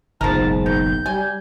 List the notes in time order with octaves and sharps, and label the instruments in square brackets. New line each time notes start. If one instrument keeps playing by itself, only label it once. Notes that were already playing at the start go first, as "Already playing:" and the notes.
[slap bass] F#1 B1 [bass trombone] G#2 [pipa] F3 A#4 [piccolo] A5
[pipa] D#3 [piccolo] G6
[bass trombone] G3 [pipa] G#5